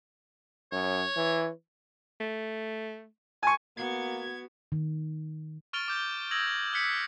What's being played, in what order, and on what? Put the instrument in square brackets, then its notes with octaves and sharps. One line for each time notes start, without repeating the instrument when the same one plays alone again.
[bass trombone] F#2 [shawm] C#5
[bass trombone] E3
[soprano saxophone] A3
[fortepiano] G#5 C#6 [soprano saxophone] A5
[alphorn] A#3 [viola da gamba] B3 [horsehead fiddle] F#4 [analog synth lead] G#6
[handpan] D#3
[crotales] C#6 F6 A6 D7 F7 G7
D6 G6 G7
D#6 E6 G#6 A#6 F7 F#7
G6
F6 F#6 G#6 B6 C#7 F#7